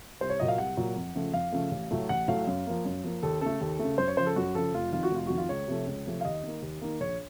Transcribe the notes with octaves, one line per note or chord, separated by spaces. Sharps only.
C2 C5
C#5
A#2 F#3 A#3 D#5
F5
C2 F#5
A#2 F#3 A#3
F2
C#3 F3 A3
F2 F5
C#3 F3 A3
A1
A2 F#3 A3
A1 F#5
A2 F#3 A3 F5
F#2
F3 A#3
F#2
F3 A#3
D#2 A4
C#3 A3 A4
D#2
C#3 A3
F#2 C5
C#5
C#3 F3 C5
A4
F#2 F#4
C#3 F3 A4
F1 F4
F2 D#3 F4
F#4
F1 F4
F2 D#3 F#4
F4
C#2 C#5
C3 F3 A3
C#2
C3 F3 A3
F5
D#2 D#5
D#3 A#3
D#2
D#3 A#3
A#1 C#5